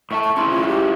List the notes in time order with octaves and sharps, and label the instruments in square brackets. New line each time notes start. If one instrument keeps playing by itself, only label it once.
[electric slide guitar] A2 E5 A5 [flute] C#6
[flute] C#6
[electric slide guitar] C#4 E4 G#4 [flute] C6
[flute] F4
G4